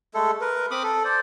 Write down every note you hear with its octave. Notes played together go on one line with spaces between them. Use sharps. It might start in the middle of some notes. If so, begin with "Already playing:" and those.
G#3 A3 A4
A#4 B4
C4 B5 D6 D#6
A4
C5 D5